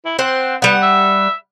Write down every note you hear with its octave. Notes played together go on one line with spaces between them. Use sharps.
E4
C4 C5 F#5
G3 B3 F#5
E5